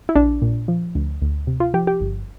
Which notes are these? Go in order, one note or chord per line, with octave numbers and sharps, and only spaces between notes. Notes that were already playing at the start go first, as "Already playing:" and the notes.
E4
A#1 D4
A#2
F3
D2
D2
C3
F4
F3 G4
G4
G1